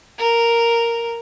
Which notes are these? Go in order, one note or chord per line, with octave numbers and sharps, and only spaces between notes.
A#4